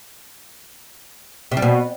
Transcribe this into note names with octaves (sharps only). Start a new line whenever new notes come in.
C3
G3
B2